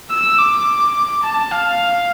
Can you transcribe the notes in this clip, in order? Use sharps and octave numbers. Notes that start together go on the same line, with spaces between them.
E6
D6
A5
F5